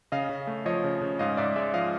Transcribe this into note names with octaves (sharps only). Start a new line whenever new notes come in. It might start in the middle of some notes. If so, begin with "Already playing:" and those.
C#3 D#5 F5
C#3
A3
F3 C#5 D#5
C#3
C#3
G#2 D#5 F5
G#2 D5 E5
G#3 D5 E5
F3 D#5 F5